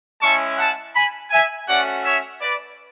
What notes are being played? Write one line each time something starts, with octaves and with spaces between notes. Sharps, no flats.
G#3 C#4 E4 A5 C#6
F#5 A5
G#5 B5
E5 G#5
A3 C#4 F#4 D5 F#5
C#5 E5
B4 D5